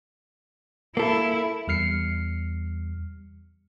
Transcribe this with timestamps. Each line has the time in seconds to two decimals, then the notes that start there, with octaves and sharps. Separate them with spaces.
0.97 A#3 E4 A4
1.68 E2 G3 F6 C7 C#7